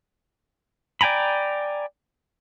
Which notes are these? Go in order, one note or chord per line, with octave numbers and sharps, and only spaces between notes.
D5 G5 G#5 A#5 B5